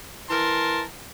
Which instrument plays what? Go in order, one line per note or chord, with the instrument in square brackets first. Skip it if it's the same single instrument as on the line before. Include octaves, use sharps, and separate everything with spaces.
[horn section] E3 A#4 A5 C6